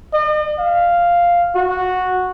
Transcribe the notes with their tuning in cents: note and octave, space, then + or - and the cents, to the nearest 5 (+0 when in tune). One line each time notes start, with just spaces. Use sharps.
D#5 -45
F5 -5
F#4 -10